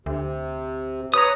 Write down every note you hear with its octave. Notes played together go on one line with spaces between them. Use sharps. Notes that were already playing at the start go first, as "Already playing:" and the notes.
D2 C3
B4 C#5 A#5 D#6